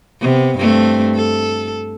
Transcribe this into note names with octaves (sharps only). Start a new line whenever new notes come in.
C3 B3
G2 A3 C4
A4